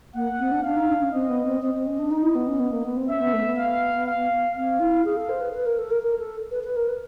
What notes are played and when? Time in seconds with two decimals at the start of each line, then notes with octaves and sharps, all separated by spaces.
0.15 A#3 F#5
0.39 C4
0.51 D4
0.64 D4 F5
0.76 D#4
0.89 D4
1.01 C#4
1.12 C4 D#5
1.29 B3
1.45 C4
1.62 C4 D#5
1.74 C4
1.86 C#4
1.99 D4
2.11 D#4 D#5
2.23 E4
2.35 B3
2.47 C#4
2.60 B3
2.72 A#3
2.84 B3
2.97 C4
3.08 C#4 E5
3.21 B3
3.33 A3
3.45 B3
3.58 F5
4.06 F5
4.56 C4 F5
4.80 E4
5.04 G#4 F5
5.16 A4
5.29 C5
5.41 B4
5.53 B4
5.66 A#4
5.78 A4
5.90 A#4
6.02 A#4
6.19 A4
6.51 B4
6.64 B4
6.76 A#4
6.88 B4